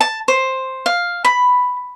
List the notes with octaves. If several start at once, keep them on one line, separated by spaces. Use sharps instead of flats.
A5
C5
F5
B5